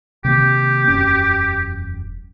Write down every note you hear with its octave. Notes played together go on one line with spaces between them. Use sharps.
C3 D#3 A#3 G4
E1 F#2 C#4